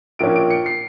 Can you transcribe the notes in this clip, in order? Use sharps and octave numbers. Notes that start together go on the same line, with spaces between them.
A#1 A#2 F3 A#3 C#4 D7
D7
C#7
C7